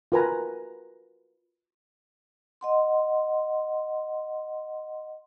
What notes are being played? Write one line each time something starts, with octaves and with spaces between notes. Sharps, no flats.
F4 F#4 A#4 B4 G#5 A#5
D#5 F#5 C6